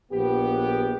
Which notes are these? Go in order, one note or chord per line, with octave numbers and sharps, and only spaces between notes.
A#1 B3 G4